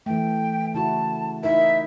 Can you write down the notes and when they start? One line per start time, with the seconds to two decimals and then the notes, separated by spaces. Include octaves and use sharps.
0.06 E3 A3 G5
0.74 C#3 E4 F#4 A5
1.43 D#4 E4 A#4 E5